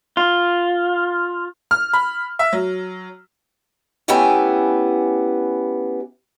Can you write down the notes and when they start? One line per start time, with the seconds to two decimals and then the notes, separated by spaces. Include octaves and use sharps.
0.17 F4
1.71 F6
1.93 B5
2.39 E5
2.53 F#3
4.08 A3 B3 C#4 E4 G4 G#5